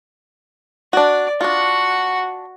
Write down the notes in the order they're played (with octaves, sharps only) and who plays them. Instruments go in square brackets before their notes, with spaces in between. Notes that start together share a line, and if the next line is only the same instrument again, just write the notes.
[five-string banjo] D4 F#4 [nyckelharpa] D5
[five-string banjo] D4 F4 [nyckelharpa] F#4 F#5